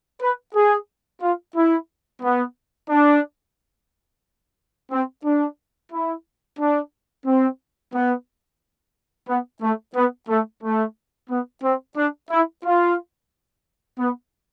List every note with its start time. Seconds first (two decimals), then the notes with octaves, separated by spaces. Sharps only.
0.21 B4
0.55 G#4
1.22 F4
1.56 E4
2.22 B3
2.90 D4
4.91 C4
5.25 D4
5.92 E4
6.60 D4
7.26 C4
7.94 B3
9.28 B3
9.62 A3
9.96 B3
10.29 A3
10.63 A3
11.30 B3
11.63 C4
11.97 D4
12.31 E4
12.64 F4
13.99 B3